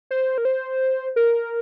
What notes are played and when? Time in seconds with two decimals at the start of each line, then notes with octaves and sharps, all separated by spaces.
0.11 C5
0.38 A#4
0.45 C5
1.16 A#4